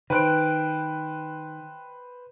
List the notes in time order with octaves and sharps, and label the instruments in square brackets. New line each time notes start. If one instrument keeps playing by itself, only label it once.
[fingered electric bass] D#3 [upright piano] B4 C5 D7 [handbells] G5 F#6